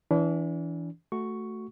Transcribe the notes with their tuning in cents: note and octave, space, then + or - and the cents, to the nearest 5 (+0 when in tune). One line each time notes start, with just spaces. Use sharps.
E3 +0 D4 -35
A3 +0 F#4 +0 C#6 +5